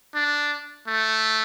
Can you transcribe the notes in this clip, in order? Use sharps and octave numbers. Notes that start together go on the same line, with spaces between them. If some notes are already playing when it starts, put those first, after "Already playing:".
D4
A3